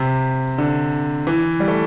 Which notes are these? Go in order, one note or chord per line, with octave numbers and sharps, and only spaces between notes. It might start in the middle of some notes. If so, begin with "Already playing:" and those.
Already playing: C3
D3
E3
G3
A3